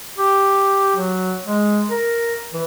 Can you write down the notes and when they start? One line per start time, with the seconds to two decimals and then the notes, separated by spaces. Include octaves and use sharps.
0.18 G4
0.96 F#3
1.46 G#3
1.90 A#4
2.53 E3